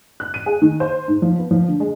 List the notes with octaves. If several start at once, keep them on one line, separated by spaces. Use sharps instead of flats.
F#6
D#7
G#4
D#3
C5
G#2
F3
B3
F3
D3
G#3